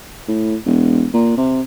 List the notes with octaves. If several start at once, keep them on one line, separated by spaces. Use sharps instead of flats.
A2
E1
A#2
C3